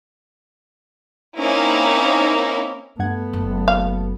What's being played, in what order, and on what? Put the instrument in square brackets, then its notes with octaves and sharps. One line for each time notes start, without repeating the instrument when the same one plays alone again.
[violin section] A#3 C4 C#4 D#4 E4 A#4
[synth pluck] G2 F#5 G#6 [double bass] A3 B3
[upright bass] F#1
[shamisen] F5